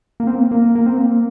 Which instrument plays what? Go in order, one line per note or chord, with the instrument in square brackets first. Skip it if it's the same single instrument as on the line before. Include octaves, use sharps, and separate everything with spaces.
[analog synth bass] A#3
C4
A#3
A#3
A#3
C4
A#3